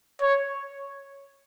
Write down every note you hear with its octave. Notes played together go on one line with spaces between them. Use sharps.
C#5